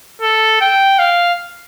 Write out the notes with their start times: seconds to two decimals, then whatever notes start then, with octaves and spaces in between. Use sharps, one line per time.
0.22 A4
0.61 G5
0.99 F5